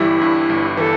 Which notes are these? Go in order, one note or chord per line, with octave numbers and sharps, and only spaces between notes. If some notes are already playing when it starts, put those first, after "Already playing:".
Already playing: G1 G2 E3 G3 E4
G2
G1
E3 A4 B4